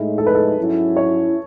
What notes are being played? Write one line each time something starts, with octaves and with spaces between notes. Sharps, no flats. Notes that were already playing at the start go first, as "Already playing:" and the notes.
Already playing: A2 G#3 D#4 E4
A4
B4
A4
G#2 F#3 C#4 E4
C#5